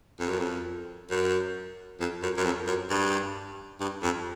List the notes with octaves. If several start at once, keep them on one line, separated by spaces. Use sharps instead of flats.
F2
F#2
F2
F#2
F2
F#2
F#2
F2
F#2
G2
G2
F2